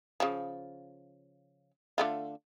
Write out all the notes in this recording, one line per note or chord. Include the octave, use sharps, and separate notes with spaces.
C#3 F3
D3 A3 F4